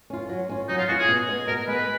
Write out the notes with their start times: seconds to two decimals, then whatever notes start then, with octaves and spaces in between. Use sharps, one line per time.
0.10 C#4 F4
0.29 F#3
0.49 C#4 F4
0.68 F#3 D#4
0.78 F4
0.88 C#4 F4 F#4
0.98 G#4
1.08 B2
1.28 G#3 B3
1.47 B2 A#4
1.68 G#3 B3 B4